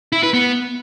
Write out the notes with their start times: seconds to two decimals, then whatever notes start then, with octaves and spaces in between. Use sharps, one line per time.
0.12 E4
0.23 B4
0.34 B3